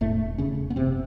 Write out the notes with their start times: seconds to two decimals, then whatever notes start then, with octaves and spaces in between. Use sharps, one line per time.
0.01 E1 A2 A3
0.38 E1 C#3 C#4
0.70 B3
0.76 F#1 C3 C4